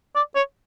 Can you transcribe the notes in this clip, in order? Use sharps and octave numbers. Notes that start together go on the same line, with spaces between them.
D5
C#5